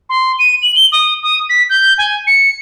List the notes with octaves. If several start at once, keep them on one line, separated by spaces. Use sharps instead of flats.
C6
D#7
F#7
G7
D#6
D#6
B6
G6
G#5
C#7